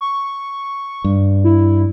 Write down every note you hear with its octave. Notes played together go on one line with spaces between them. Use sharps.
C#6
G2
E4